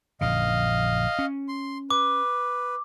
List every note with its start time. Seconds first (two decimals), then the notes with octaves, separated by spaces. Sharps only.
0.21 A#1 F#2 D3 D#5 F5
1.19 C#4
1.49 C6
1.90 B4 D6